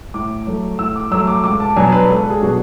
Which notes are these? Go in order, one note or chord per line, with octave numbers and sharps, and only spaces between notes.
A2 D6
F#3 A3
A2 E6
D6
F#3 A3 E6
D6
C#2 D6
A5
B2 F#3 B3 D4 G#5
B4
C#2 A4
G#4
B2 F#3 B3 D4 F#4